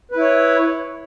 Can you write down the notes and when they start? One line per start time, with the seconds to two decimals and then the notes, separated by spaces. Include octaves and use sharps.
0.12 B4
0.16 E4
0.21 C#5